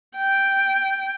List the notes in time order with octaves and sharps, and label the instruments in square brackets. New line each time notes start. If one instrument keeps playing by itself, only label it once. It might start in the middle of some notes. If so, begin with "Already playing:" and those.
[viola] G5